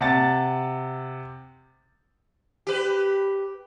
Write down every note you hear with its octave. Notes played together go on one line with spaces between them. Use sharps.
C3 F#5 A5 A6
G4 B4